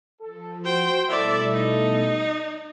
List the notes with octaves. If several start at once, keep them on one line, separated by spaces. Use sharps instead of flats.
F3 A4
F#4 C5 G5
B2 G3 A3 E4 A4 D5 E5
D#4
D5